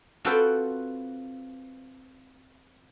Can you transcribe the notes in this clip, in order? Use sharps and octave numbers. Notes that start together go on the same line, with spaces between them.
C4 F4 F#4 A4 B4 G5